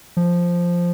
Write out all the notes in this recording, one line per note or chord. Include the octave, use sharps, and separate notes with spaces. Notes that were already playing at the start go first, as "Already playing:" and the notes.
F3